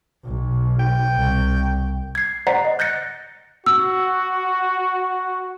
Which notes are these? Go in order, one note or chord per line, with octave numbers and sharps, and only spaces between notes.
B1
G5
C2
G#6 C7
C5 D5 F#5 A#5 B6 C7
D#5
F#6 G6 A6 A#6 C#7
F#4 E6